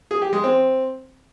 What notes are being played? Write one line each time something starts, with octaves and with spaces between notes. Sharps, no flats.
G#4
G4
G#3
C4